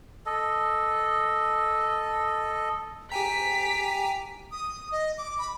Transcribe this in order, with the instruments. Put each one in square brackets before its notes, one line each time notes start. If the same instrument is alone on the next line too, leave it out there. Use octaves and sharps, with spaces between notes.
[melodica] A4 D#5
[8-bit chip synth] G4 G#5 A#5 [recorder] G5 [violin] B6
[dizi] D#6
D#5
D6
B5